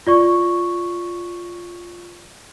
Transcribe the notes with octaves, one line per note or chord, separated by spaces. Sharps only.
F4 D5 C#6